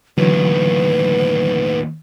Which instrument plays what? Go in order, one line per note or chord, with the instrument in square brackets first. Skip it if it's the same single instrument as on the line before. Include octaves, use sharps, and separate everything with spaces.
[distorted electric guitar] D#2 A2 [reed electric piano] D3 E3 F#3 [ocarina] B4